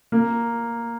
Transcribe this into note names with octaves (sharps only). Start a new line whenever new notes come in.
A#3